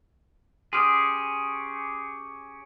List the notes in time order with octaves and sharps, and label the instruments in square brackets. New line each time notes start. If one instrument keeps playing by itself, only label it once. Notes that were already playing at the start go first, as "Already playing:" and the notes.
[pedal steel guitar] C#4 G4 G#4 [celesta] C6 D#6 F6